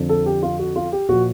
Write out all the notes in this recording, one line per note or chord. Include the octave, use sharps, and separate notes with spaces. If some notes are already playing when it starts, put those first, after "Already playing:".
Already playing: F2 D3 F3
A4
G4
F4
F#4
F4
G4
A#2 F3 F#4